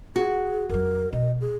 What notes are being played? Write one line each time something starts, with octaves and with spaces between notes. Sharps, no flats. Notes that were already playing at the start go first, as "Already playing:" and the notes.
F#4 G#4
F2 F#3 A#4
B2 D#5
G#4